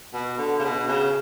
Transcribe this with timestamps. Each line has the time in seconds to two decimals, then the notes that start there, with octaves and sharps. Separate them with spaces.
0.13 B2
0.38 D3
0.59 C#3
0.64 B2
0.88 C#3